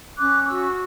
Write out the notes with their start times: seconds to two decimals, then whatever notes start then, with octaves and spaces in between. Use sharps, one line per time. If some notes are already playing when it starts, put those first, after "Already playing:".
0.18 C#4 D6 F#6
0.44 D6
0.48 F#4 C#6 E6